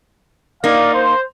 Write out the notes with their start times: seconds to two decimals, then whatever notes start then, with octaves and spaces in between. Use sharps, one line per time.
0.64 A#3 D#4 D5 F5
0.95 C5